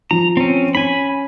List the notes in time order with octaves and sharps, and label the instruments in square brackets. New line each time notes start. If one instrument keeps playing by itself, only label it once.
[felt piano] F3 [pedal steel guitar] A#5
[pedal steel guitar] C4 C#4
[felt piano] C#4 [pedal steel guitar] G#5 B5